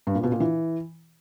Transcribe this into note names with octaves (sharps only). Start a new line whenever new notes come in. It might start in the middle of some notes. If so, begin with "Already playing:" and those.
G2
A#2
B2
A#2
E3